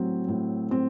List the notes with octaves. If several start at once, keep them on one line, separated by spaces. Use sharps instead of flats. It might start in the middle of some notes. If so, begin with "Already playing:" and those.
Already playing: A2 F#3 C4
A2
C4